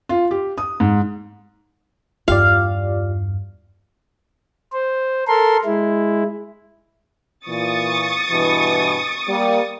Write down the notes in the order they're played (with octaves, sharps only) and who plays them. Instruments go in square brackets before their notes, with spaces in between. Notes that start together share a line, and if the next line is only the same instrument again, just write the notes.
[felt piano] F4
G4
D#6
G#2
[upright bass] E2 G2 [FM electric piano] F4 G4 D5 [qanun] F5
[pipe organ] C5
A4 A#4 C6
G#3 E4
[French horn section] A#2 E3 [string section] C#6 D#6 A6
[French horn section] G2 B2 E3
G3 A#3